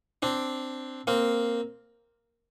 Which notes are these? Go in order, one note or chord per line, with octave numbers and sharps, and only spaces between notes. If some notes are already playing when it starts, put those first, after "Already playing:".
C4 D4
A#3 C4